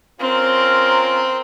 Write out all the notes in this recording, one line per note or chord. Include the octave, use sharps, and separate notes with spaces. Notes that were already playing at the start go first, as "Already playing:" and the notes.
C4 C#4 F4 A#4